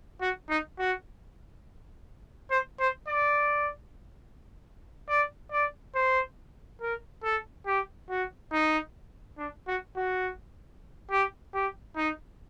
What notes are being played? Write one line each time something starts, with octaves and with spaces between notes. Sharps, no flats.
F#4
D#4
F#4
C5
C5
D5
D5
D5
C5
A#4
A4
G4
F#4
D#4
D4
F#4
F#4
G4
G4
D#4